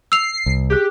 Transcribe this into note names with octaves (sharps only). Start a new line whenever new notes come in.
E6 C7 F7
C2
G4 G#4 F#6